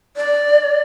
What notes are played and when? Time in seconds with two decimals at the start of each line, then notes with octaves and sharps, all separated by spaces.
0.17 D5